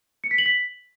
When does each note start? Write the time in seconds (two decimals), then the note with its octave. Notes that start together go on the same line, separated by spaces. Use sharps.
0.24 C#7
0.31 B6
0.38 F#7
0.46 B6